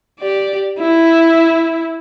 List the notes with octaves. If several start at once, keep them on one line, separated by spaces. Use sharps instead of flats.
G4 D5
E4